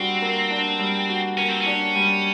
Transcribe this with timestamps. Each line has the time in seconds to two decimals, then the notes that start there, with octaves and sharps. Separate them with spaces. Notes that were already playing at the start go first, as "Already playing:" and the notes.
Already playing: G3 A#3 C4 D4 F#4
0.22 A#3
0.51 D4
0.79 G3
1.09 F#4
1.38 A#3 C#4
1.50 C4
1.61 C#4
1.66 D4
1.96 G3